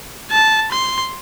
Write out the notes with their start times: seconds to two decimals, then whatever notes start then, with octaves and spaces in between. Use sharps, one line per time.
0.31 A5
0.71 C6